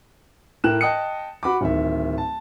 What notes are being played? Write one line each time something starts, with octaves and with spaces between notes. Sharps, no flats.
A2 A#4 G5 F#6 E7
D#5 G5 A5 D#6 F#6 C#7
F#4 B5 D6
D1 D#3 E5
A5